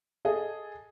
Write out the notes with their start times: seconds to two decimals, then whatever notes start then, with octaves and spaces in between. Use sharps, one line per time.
0.25 G#4 A4 D#5